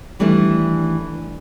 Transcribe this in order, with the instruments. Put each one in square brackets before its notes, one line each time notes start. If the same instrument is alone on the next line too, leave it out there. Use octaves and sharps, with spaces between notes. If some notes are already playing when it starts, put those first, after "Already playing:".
[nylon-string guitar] D#3 E3 G3 A3 D4